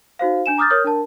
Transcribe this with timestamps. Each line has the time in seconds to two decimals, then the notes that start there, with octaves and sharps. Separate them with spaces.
0.19 D#4 F#4 C5 F5
0.46 D4 G#5 E7
0.58 A#5 D6 D#6 F6 G6 A6
0.70 A#4 C#5 D#6 F6 G6
0.84 D4 A#4 A5